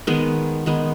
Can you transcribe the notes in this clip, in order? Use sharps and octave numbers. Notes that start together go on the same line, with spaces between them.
D#3 G#3 B3
D#3 G#3 B3